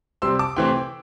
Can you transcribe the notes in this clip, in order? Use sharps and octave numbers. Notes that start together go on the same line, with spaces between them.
C3 G3 C4 C6 E6
A5 D6
C3 E3 A3 C4 G5 C6